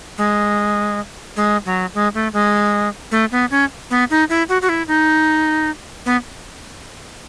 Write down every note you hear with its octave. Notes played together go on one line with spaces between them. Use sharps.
G#3
G#3
F#3
G#3
A3
G#3
A3
B3
C#4
B3
D#4
E4
F#4
F#4
E4
D#4
B3